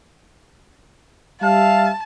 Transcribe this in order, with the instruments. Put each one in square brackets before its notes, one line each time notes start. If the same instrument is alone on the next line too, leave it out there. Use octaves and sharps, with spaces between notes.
[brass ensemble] G3 E5 F5 [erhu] A5